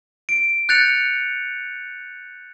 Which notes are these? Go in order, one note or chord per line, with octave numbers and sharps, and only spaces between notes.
D7
F#6 G6 A6 C#7 F7